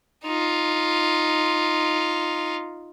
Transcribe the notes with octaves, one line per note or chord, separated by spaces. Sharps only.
D#4 F4